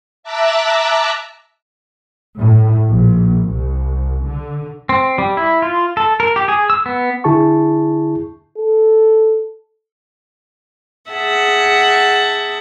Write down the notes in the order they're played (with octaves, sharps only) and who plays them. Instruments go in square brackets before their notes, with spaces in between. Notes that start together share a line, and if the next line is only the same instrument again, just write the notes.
[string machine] E5 A5 A#5 D6 E6 F#6
[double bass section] A2
A#1
C2
D3
[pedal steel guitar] C4
G3
E4
F4
A4
A#4
G4
G#4
E6
B3
[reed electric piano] D3 E4 G#4 A5 C#6
[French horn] A4
[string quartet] G#4 E5 F#5 A5